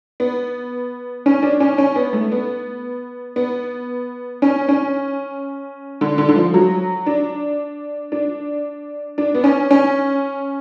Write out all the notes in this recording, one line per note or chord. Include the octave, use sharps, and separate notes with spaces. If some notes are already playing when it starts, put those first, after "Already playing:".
B3
C#4
D4
C#4
C#4
B3
A3
B3
B3
C#4
C#4
D3
D3
D3
F3
F#3
D4
D4
D4
B3
C#4
C#4